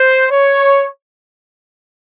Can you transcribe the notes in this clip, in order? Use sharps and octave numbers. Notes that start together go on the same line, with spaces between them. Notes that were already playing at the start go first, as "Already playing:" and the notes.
Already playing: C5
C#5